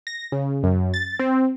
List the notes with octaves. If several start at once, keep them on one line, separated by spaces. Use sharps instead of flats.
A#6
C#3
F#2
A6
C4